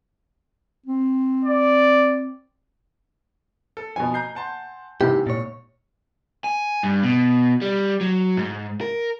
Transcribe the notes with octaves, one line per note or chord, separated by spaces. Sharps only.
C4
D5
A4
B2 F3 G#5
A#5 G6 C7
F#5 A5 C6
G#2 C3 E3 E4 G4
A#2 C#5
G#5
G2
B2
G3
F#3
G#2
A#4